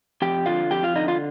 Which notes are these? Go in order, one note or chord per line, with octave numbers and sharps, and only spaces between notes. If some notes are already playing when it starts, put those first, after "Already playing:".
F2 G4 G5
D3 F4 F5
F2 G4 G5
F4 F5
D3 D#4 D#5
F4 F5